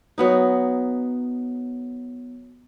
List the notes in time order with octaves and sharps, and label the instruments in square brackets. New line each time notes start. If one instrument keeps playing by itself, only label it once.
[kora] F#3 B3 D#4